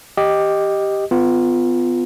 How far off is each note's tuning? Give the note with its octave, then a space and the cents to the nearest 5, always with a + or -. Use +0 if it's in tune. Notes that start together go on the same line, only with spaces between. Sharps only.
G4 +0 D#5 +0
B3 +30 F4 +0